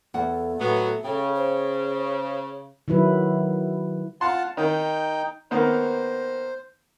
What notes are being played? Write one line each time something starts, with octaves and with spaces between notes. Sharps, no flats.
E2 A4 F#5
A2 F#3 B3
C#3 G5
C5
D#3 F#3 E4 B4
F4 F#5 A5 C6
D#3 D#4 G5
D#3 A#3 B3 C5